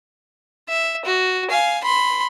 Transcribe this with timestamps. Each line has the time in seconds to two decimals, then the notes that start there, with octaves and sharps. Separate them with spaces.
0.69 E5
1.05 F#4
1.51 F5 G#5
1.84 B5 C6